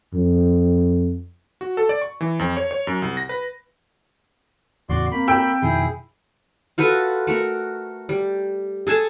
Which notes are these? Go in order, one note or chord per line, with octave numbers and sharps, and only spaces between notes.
F2
F#4
A4
D5
C#6
E3
F2
C#5
C#5
F#2
C2
A#6
B4
E2 A2 C#3 F#4 D5 C6
A#3 C4 B5
G5 E6
F2 B2 D#3 E4 G#4
F4 F#4 A4 B4
A3 F#4 A#4
G3
G#4 A4 G#5 A5